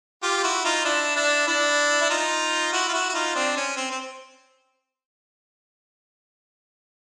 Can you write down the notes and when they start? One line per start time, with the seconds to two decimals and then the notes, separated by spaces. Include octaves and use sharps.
0.23 F4 G4
0.37 G4
0.43 E4 F#4
0.65 D#4 F4
0.85 D4 E4
1.16 D4 E4
1.47 D4 E4
2.02 E4
2.10 D#4 F4
2.73 E4 F#4
2.88 F4
2.94 E4 F#4
3.09 F#4
3.14 D#4 F4
3.35 C4 D4
3.57 C#4
3.77 C4
3.91 C4